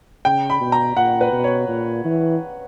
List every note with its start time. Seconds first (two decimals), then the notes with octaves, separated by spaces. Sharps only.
0.25 C#3 G5
0.50 B5
0.61 B2
0.72 A#5
0.97 A#2 F#5
1.21 B4
1.32 B2
1.44 C#5
1.68 A#2
2.05 E3